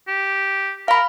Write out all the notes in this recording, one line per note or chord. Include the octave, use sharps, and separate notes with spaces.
G4
A#4 F5 B5